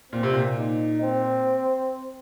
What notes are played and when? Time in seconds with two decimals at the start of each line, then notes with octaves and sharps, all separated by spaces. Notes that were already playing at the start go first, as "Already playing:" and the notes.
0.12 A#2 C4
0.23 C3
0.33 A#2
0.57 D#4
1.02 C4